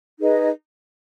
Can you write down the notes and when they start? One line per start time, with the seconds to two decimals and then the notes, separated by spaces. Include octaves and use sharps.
0.19 D#4 G#4 B4 D#5